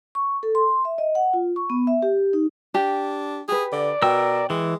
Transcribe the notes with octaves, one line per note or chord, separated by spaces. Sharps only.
C#6
A4
C6
E5
D#5
F#5
F4
C#6
B3
E5
G4
D#4
D4 G4
G4 G#4 B4
D3 D5
B2 A#4 G5 E6
E3 G#3